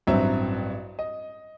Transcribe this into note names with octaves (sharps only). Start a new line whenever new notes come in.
A1 G2 F#3 C4 E5
D#5